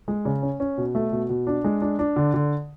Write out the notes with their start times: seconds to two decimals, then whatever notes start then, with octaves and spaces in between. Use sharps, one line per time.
0.08 G#3
0.25 C#3
0.43 C#4
0.60 C#4
0.78 B2
0.95 A3
1.12 B2
1.29 B2
1.47 D4
1.64 G#3
1.82 D4
1.99 D4
2.16 D3
2.34 D3